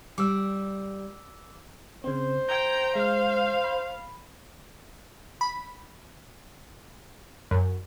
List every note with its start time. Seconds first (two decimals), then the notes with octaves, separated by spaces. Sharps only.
0.18 G3 D6 E6
2.04 C#3 C4 C5
2.49 G5 A#5 G6 G#6
2.95 G#3 F5 F6
3.64 B5
5.41 B5
7.51 F#2